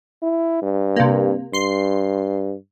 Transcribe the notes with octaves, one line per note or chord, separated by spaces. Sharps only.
E4
G2
C3 A#3
G2 C6 C7